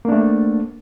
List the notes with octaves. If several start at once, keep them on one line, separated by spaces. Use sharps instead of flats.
A3 A#3 D4